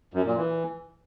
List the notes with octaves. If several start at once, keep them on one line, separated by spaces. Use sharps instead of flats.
F#2
A#2
E3